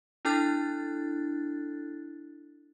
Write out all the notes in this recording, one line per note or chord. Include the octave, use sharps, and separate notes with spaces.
D4 E4 A4 F#6 A6